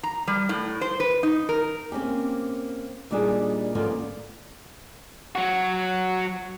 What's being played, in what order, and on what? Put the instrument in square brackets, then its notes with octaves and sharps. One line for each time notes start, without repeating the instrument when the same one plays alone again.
[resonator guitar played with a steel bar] A#5
G3
A2
C5
B4
D#4
A#4
[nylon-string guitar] A#3 C4 C#4 G4
A#2 G3 A#3 D4 D#4 G#4
D3 F3 A#3 B3 C#4 F4
[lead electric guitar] F#3 F#4